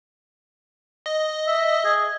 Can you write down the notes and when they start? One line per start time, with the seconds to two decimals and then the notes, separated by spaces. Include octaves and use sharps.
1.06 D#5
1.47 E5
1.85 G#4